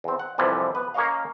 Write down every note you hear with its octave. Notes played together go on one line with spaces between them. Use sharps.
E2 C4
F#5
C2 F2 C3 E3 F3 G3
B3 B4
A#3 C#4 C#5 D#5 F5